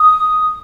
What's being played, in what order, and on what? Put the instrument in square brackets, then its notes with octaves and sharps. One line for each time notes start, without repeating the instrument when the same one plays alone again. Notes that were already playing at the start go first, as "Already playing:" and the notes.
Already playing: [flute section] D#6